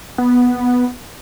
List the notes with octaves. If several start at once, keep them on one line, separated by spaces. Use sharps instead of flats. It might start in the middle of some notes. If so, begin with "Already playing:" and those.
B3